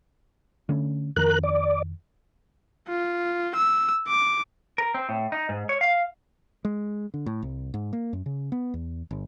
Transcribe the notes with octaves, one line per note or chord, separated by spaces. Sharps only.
D3 A3 C#4
F2 D#3 A#4 F#6
D5
F4
E6
D6
A#4
C4
A2
D#4
G#2
C#5
F5
G#3
D3
A2
C2
G#2
A#3
F#2
C#3
B3
E2
G1